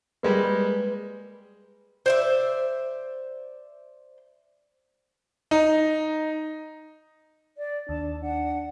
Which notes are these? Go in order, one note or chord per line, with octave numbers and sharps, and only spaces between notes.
G3 G#3 A#3 B4
C5 D5 E5
D#4
D5
D#2 D4 A5
D4 F#5